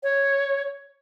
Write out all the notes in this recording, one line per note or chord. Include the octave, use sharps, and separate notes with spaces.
C#5